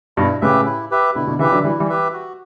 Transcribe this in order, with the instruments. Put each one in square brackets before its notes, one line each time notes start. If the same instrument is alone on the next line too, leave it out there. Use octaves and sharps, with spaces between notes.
[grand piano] G2 B2 [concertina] E4
[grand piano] A2 C#3 [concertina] G4 B4 E5
[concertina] E4
G4 B4 E5
[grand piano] B2 D3 [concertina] E4
[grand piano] B2 D3
[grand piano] C#3 E3 [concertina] G4 B4 E5
[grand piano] D3 F#3
[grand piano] E3 G3 [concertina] E4
[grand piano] E3 G3
[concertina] G4 B4 E5
F#4